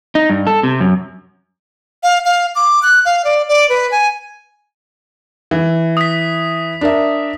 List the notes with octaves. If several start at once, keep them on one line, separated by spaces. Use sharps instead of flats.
D#4
G2
A4
C3
F#2
F5
F5
D6
F#6
F5
D5
D5
B4
G#5
E3
D#6 B6
D4 A#4 E5